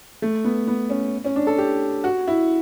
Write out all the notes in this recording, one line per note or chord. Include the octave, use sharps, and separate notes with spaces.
A3
B3
B3
C#4
C#4
D4
A4
G4
F#4
E4